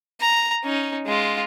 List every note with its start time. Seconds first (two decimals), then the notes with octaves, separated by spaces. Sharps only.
0.20 A#5
0.64 C#4 D#4
1.06 G#3 F4